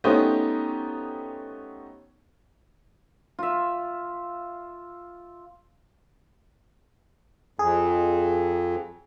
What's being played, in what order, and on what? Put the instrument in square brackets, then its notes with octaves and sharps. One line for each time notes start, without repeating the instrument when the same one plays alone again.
[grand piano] A3 B3 C#4 D#4 G4 C5
[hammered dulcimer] F4 E5
[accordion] F2 [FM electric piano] G#4